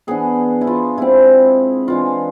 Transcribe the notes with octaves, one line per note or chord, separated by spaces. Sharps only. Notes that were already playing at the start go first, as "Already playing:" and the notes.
E3 B3 D4 G#4
E4
F4
C3 G#3 C4 E4
E3 G#3 D4 F4